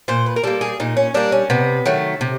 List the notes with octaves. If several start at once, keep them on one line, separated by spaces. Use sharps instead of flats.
A#2 C5
B4
A#4
G3 A#3 A4
G#4
A#2 D#4
C#4
G3 A#3 D4
C#4
C3 B3
D#3 F#3 A3
C3